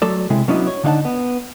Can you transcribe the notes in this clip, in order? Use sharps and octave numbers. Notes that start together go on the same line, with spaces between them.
F#3 A3 A4 D5
C3 G#3 E4
F#3 B3 C#4 D4 E4 D#5
C#5
D3 D4 D#4 F5 F#5 A5
B3